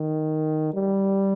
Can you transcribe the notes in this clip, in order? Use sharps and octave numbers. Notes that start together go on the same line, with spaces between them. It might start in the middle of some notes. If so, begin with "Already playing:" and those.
Already playing: D#3
G3